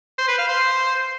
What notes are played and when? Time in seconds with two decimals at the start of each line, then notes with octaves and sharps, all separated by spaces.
0.18 C5
0.28 B4
0.38 F5
0.48 C5